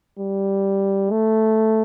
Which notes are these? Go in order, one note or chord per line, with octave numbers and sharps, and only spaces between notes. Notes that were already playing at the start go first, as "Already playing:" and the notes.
G3
A3